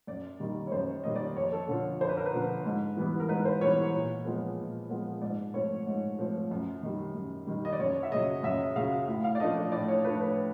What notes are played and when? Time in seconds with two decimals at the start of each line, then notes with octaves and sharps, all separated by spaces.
0.07 F#2 D5
0.40 D#3 G3 A#3 D#4
0.67 C#5
0.72 F#2 C5
1.04 D#3 G3 A#3 D#4 D#5
1.15 D5
1.36 F2 C#5
1.52 A4
1.69 D3 F3
2.00 F2 C5
2.09 B4
2.17 A#4
2.26 B4
2.33 D3 F3
2.66 G#2
2.97 E3 G3 B3
3.20 A#4
3.29 G#2 B4
3.45 C5
3.61 E3 G3 B3 C#5
3.94 A#2
4.25 F3 G#3 B3
4.58 A#2
4.90 F3 G#3 B3
5.22 G#2 D5
5.54 F3 A3 C4 C#5
5.87 G#2
6.19 F3 A3 C4
6.51 F#2
6.83 D#3 G3
7.14 F#2
7.47 D#3 G3
7.65 D#5
7.73 D5
7.79 F#2 C#5
8.03 E5
8.11 C#3 F#3 D#5
8.43 F#2 E5
8.76 C#3 F#3 F5
9.08 A2 F5
9.24 F5
9.35 D5
9.40 F3 A3 D4 D#5
9.57 D5
9.72 A2 D5
9.88 C#5
10.04 F3 A3 D4 B4
10.20 B4